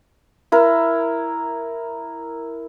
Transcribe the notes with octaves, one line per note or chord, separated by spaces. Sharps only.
E4 A#4